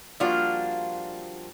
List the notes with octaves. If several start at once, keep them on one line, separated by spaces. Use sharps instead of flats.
F3 G3 A#3 D4 F4 F#4